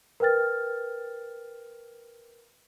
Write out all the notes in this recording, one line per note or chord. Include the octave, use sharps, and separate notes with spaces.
A#4 B4 G5 F6 A6